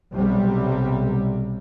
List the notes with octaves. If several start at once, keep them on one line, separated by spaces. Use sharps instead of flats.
B1 C3 G3